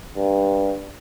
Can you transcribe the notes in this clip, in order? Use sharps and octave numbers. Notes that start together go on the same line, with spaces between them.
G2